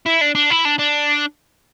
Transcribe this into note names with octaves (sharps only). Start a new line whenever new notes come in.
E4
D4
D4
E4
D4
D4